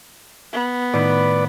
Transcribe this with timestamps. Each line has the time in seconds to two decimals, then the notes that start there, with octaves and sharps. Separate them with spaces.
0.52 B3
0.94 A2 D#3 B4 D5